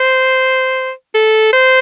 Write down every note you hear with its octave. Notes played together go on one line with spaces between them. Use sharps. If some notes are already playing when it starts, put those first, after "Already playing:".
Already playing: C5
A4
C5